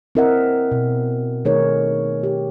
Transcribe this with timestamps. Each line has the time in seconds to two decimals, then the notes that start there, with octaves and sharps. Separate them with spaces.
0.15 C4 E4 A#4 D#5 E5 F#5
0.72 B2
1.45 D#3 A3 D#4 G#4 A#4 C#5
2.23 G4